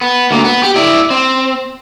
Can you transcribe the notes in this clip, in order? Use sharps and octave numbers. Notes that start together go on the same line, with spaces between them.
B3
D2 A#3
B3
G4
E4 D5
C4